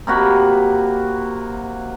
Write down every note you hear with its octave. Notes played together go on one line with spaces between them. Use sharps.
C3 A#3 F#4 B5